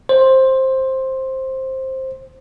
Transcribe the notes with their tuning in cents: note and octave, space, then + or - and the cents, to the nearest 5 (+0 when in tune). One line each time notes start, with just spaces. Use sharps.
C5 +10